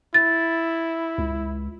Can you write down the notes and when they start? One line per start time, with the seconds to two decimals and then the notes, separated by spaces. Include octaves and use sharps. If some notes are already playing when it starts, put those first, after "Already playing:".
0.14 E4 A6
1.18 C#2